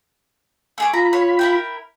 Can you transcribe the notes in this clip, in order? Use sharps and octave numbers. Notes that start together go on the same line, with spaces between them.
A3 G#4 D6
F4 A#5 B5
C#5
E4 A#4 G5